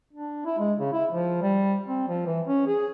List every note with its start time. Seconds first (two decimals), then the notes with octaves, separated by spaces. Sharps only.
0.13 D4
0.46 E4
0.59 G#3
0.79 C#3
0.93 E4
1.12 F3
1.42 G3
1.87 C4
2.08 F3
2.26 E3
2.47 C#4
2.67 G#4